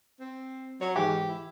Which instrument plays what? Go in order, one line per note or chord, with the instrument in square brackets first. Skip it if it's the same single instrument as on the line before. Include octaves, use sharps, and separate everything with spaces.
[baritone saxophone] C4
[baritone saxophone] F#3 [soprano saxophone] C#5
[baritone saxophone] G#2 [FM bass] E3 [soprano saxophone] G4
[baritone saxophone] E4